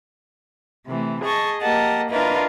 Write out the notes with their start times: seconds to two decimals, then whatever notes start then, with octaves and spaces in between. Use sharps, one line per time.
0.87 C3 E3 A3
1.23 G#4 D#5 A5 C#6
1.62 A#3 G4 A#4 D#5 F#5 A5
2.10 D4 E4 F4 A#4 B4 D#5